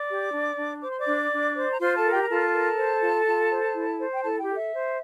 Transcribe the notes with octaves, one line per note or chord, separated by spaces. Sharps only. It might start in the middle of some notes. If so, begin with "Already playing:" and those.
Already playing: D5 D6
G4
D4
D4
C5 D6
C6
D5 D6
D4
D4
C5
A#5
F4 C5 C6
A4 A5
A#4
G4 G5
A#5
F4 A4 A5
A#4
C5
F4
F4
C5
E4
C5
G5
E4 A4 A5
G4 G5
A4
E5
C5